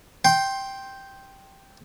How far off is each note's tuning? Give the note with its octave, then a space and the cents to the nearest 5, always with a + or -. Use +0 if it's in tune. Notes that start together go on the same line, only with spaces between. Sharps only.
G5 -5 C6 +15